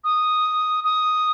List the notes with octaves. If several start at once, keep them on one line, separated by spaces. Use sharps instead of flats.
D#6
D#6